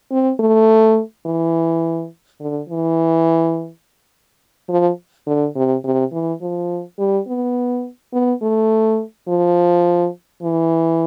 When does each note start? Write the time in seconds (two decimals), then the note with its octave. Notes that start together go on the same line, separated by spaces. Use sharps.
0.11 C4
0.40 A3
1.26 E3
2.41 D3
2.69 E3
4.70 F3
5.27 D3
5.56 C3
5.85 C3
6.13 E3
6.42 F3
6.99 G3
7.28 B3
8.13 B3
8.42 A3
9.28 F3
10.43 E3